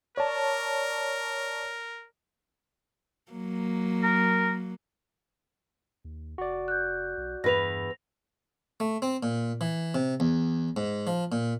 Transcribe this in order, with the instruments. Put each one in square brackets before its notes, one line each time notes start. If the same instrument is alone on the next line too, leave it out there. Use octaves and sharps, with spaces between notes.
[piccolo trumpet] A#4 [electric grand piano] C#5 D5 A5
[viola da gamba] F#3 A#3
[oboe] A#4
[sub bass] D#2
[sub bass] F1 [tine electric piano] F#4 D5
[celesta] F#6 G6
[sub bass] B1
[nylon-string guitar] E2 B4 [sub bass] G2 [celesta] A#6 F7
[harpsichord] A3
C4
A#2
E3
C3
E2
G#2
F3
A#2